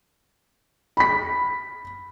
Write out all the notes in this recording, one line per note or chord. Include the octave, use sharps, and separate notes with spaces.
B5 B6